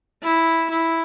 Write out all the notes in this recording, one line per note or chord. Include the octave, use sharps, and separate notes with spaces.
E4
E4